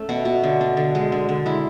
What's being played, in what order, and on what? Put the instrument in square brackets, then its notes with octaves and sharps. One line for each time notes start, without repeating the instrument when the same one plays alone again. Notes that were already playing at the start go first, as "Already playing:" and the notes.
Already playing: [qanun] A3 C#4 A4
B2 F#4
B2
D3
D4
D3
G#3
D3
D3
G#3 E4